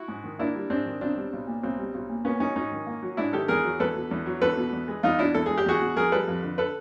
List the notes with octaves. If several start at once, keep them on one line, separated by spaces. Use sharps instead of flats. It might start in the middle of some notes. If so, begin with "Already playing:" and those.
Already playing: E4 F#4
G#2
D#3
A#3 D4 E4
G3
G#2 C4 D4
D#3
B1 C4 D4
G3
B1
A#2
B1 C4
G3
B1
A#2
A#3 B3 C#4
F#3 C#4 D#4
G#2 C#4 D#4
D#3
A#3
F#3
G#2 D4 E4
D#3 G4 A4
E2 G#4 A#4
F#3
E2 A4 B4
B2
E2
F#3
E2 A4 B4
B2
E2
G#3
E2 D#4 F4
B2 D4 E4
E2 A4
G#3 G#4
G4
E2 F#4 G#4
B2
F2 G#4 A#4
G3 A4 B4
F2
D3
A4 B4